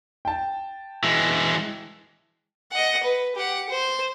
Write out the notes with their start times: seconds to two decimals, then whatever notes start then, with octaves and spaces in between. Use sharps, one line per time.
0.25 G5 A5
1.04 E3 G#3
2.71 D#5 F#5
3.03 B4
3.36 G4 F#5
3.70 C5